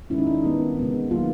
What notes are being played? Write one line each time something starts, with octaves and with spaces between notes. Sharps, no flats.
D#3 G#3 C#4 E4
D#4
D4
D#4
D#3 G3 B3
C3 E3 G#3 B3
D#3 F#3 A#3 F4